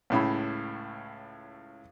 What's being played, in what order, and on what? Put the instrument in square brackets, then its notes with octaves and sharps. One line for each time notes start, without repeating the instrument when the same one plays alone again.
[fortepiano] C#2 A2 C#3 B5